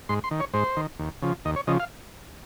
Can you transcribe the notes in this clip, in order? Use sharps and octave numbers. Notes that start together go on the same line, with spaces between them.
G#2 C6
C6
D#3
C#5
G#2 C5
D#3
D#2
C#3 F3
D#2 D#5
C#5
C#3 F3 D#5
F5